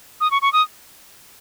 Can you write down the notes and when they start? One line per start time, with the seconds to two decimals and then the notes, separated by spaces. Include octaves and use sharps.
0.21 D#6
0.31 C#6
0.42 C#6
0.53 D#6